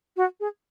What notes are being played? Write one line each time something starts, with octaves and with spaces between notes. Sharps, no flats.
F#4
G#4